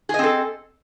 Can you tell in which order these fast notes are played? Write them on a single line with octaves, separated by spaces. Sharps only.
G#4 D#5 C4 A4